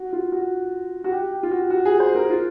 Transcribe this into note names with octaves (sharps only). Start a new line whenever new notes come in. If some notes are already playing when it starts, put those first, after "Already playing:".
Already playing: F#4
F4
F#4
F#4
G4
G4
F4
F#4
F#4
G#4
C5
A#4
F4